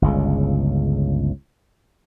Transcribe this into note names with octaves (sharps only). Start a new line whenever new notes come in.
G1 C#2 C#3